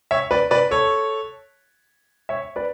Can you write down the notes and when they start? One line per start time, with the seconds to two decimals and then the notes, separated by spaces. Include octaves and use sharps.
0.11 C#5 E5
0.31 B4 D5
0.51 B4 D5
0.71 A4 C#5
2.29 C#5 E5
2.56 B4 D5